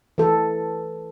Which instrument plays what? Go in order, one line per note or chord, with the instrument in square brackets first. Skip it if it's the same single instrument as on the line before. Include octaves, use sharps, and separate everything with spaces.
[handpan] E3 A4